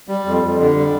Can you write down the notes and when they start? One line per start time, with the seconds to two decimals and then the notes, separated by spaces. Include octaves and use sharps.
0.08 G3
0.25 F2
0.43 F2
0.59 D3
0.75 G3